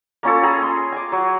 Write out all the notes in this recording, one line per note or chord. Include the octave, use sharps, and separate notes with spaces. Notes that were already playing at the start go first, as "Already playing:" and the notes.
A#3 C#4 F4 A4
G#4 G#5 A#5 B5
C6
G#5 D6
F#3